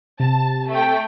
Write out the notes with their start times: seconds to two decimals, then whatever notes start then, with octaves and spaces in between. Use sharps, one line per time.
0.20 C3 A5
0.69 A3 G5